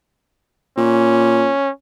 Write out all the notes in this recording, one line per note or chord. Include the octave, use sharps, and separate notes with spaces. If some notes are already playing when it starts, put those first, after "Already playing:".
A#2 C#4